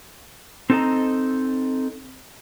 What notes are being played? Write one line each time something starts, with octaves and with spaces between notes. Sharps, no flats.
C4 D#4 A4 B4 D#5 A#5